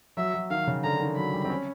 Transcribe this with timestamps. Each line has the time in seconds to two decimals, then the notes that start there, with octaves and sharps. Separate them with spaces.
0.17 F#3 E5
0.34 F#3
0.50 D#3 F5
0.67 C#3
0.84 D3 A#5
1.00 D#3
1.16 F#3 B5
1.34 G3
1.45 C4
1.50 C#4